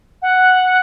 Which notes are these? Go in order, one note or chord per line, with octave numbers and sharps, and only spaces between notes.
F#5